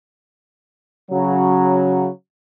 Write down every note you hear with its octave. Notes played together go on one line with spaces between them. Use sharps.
C#3 F#3